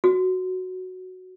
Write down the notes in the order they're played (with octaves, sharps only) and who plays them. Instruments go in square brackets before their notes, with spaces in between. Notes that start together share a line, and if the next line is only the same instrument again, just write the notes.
[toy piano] F#4